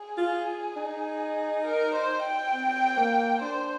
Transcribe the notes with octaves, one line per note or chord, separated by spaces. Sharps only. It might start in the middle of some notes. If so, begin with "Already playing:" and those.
Already playing: G#4
F4
D#4
A#4
C5
G5
C4
A#3
D4 C5